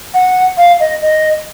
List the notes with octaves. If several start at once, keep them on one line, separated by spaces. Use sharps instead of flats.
F#5
F5
D#5
D#5